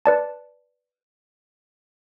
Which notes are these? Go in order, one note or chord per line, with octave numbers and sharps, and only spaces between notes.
B4 D5 A5